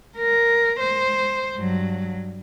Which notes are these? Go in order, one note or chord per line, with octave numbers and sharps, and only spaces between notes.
A#4
C5
G2 F#3